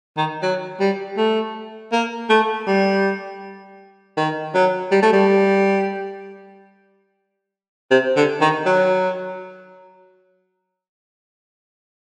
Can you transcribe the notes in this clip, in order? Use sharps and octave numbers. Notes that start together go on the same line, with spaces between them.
D#3
F#3
G3
A3
A#3
A3
G3
D#3
F#3
G3
A3
G3
C3
D3
D#3
F#3